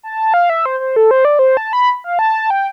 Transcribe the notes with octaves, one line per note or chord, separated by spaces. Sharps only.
A5
F5
E5
C5
C5
A4
C5
D5
C5
A5
B5
F5
A5
G5